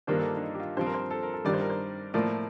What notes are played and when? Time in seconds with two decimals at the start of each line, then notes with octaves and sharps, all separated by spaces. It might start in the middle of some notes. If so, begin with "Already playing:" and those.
0.07 G2 D#3 A#3 D4 C5
0.19 A4
0.31 F4
0.37 D4
0.42 D#4
0.55 G4
0.60 F4
0.77 G2 F3 C4 C5
0.86 A#4
0.94 C5
1.11 A4
1.23 A#4
1.34 A4
1.45 G2 D#3 G3 D5
1.53 C5
1.62 A#4
1.70 C5
2.14 A2 F3 A#3 D5